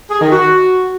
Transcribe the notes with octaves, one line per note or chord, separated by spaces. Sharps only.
G#4
D#3
F#4